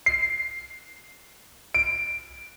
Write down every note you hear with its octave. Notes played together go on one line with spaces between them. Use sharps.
C7
D7